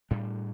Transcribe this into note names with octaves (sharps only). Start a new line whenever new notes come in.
A2 G3 D4